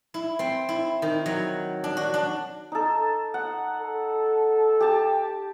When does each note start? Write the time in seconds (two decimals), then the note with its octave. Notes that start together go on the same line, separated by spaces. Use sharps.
0.14 E4
0.39 C4
0.69 E4
1.02 D#3
1.26 F#3
1.84 D4
1.97 F#4
2.14 D4
2.72 D#4 A4
3.34 F#5
3.80 A4
4.80 G4 A5